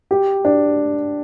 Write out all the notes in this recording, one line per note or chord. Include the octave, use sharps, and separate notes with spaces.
G4
D4